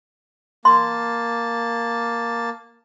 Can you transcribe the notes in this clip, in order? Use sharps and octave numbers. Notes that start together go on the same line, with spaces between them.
A#3 A5 C6